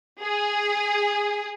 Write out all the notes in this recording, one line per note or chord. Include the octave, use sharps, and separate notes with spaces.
G#4